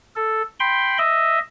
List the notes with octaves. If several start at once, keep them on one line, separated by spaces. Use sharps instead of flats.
A4
G5 B5 C6
D#5 E5